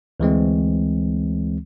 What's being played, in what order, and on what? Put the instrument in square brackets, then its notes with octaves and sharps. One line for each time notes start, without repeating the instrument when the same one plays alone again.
[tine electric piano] D2 E3 G#3 C4